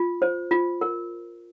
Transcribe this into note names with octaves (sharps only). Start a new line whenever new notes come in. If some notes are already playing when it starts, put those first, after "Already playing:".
Already playing: F4
C5
F4
A#4